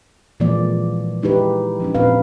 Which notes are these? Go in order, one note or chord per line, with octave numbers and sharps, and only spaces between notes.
A#2 E3 F3 G#3 A#3 D5
G#3 D#4 E4 G4 B4
F3 C#4 D#4
A#2 C4 D4 B4 F5